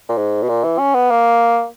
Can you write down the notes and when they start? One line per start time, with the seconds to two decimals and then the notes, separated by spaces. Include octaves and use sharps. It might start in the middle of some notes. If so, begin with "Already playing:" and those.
0.09 A#2
0.18 G#2
0.43 B2
0.49 A#2
0.64 E3
0.79 C#4
0.95 B3
1.10 A#3